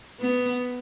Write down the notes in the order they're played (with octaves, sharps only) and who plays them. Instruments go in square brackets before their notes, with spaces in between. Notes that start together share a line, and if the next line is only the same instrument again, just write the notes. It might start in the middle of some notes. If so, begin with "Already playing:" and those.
[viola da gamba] B3